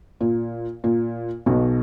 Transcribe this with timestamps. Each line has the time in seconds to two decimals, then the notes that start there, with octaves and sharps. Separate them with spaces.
0.21 A#2
0.84 A#2
1.46 B1 B2